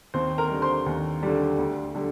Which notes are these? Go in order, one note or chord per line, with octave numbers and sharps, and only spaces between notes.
D#2 C4 C5
A#4 A#5
D3 G3
C5 C6
D#2
D3 G3
D2
D3 G3